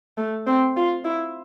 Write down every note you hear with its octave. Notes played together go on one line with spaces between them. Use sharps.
A3
C4
F4
E4